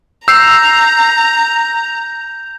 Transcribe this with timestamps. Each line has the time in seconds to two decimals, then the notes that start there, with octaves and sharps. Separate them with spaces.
0.28 A#5 E6 G6 C7 F7